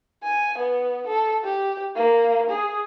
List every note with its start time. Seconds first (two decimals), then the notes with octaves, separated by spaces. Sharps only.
0.23 G#5
0.58 B3
1.07 A4
1.44 G4
1.95 A#3
2.50 G#4